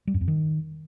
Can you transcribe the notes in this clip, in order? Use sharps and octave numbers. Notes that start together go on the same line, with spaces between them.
G3
F#2
F2
D#3